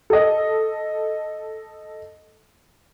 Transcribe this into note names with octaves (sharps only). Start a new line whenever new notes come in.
A4 D#5